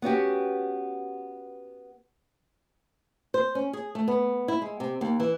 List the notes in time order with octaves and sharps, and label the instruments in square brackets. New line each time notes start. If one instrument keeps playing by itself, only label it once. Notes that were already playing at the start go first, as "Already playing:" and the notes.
[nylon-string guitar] B3 C#4 F#4 G4
C5
C#4
G#4
A3
B3
E4
G#3
C3
D#2
E3